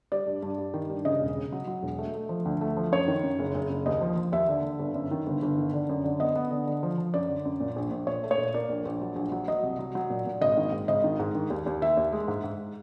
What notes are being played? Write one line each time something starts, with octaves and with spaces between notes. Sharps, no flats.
G3 D5
G2
G2
G3
D#3
G2
C#3 D#5
E1
C#3
F#3
F#3
E1
A3
A3
F3
D2
A3
F3
F#2 C#5
D#3
F#2
F#1
F#1
F#1
D#2 D#5
F3
F3
D#2 E5
D3
D3
G1
F#2
D#3
G1
G1
D#3
D3
F#2
D3
B3 D#5
B3
D3
D3
F3
F3
F#2 D5
D3
F#2
A#2
A#1
A#1
A#2 C#5
A3
C#5
A#2
A#3 D5
A#1
A#1
F#3
A#1
F#3
F#3 D#5
C2
F#3
F#3
A#2
A#2
G#1 D#5
D#3
G#2
G#1 D#5
D#3
G#2
D#3
D#2
D#2
D#3 E5
D#2
G#3
G#2
G#2